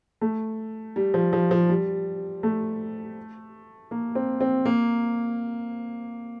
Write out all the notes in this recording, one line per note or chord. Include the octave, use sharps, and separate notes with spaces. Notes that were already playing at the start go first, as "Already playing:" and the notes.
A3
G3
F3
F3
F3
G3
A3
A#3
C4
C4
A#3